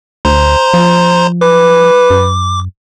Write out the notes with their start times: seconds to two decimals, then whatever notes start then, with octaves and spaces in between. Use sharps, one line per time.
0.25 D2 C5 A#5 C6
0.74 F3
1.41 B4 D6
2.10 F#2